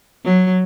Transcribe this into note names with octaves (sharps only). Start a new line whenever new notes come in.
F#3